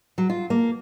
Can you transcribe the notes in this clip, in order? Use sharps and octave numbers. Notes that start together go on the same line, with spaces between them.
F#3
F4
A#3